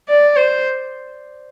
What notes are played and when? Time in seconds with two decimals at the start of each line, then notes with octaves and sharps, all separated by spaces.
0.09 D5
0.36 C5